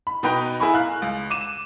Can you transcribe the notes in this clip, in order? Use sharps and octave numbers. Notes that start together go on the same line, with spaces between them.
B5
B2 D#4 B4 G5 A#5
E4 G#4 A#4 G#5 B5 C#6
F5 F#6
C#2
D6 D#7 E7